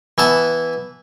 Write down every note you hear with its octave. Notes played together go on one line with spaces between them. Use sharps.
E3 B3 A5